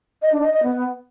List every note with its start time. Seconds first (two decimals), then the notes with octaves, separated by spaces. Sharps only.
0.22 D#5
0.32 D4
0.43 D#5
0.53 D#5
0.63 B3